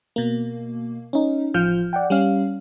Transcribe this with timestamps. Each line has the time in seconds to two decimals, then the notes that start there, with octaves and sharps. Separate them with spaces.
0.16 B2 A#3
1.13 C#4 D#4
1.54 A1 F3 F4 F6 G6
1.93 D5 F#5 G5
2.10 G3 C#4 F5